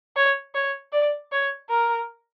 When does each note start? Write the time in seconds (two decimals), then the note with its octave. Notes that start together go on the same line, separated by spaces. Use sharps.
0.16 C#5
0.54 C#5
0.93 D5
1.32 C#5
1.70 A#4